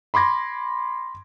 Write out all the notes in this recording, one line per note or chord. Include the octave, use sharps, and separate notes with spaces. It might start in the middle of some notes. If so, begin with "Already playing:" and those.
B5 C6 D6 G#6 A#6